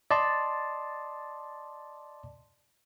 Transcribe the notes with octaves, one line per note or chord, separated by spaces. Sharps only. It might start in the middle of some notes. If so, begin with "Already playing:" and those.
D5 D#5 A5 C6